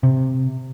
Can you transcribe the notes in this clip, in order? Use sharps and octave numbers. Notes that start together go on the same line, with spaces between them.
C3